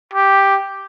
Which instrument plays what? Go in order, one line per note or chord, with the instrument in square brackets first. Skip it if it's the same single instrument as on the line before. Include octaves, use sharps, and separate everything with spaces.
[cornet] G4